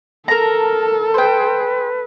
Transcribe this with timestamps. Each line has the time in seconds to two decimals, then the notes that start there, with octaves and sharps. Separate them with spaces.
0.28 A4 A#4 A5 A#5
1.14 B4 C5 G5